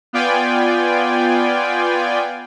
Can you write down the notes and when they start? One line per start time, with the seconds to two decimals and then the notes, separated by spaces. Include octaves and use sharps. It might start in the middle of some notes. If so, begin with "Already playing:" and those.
0.13 B3 F4 D5 G5 G#5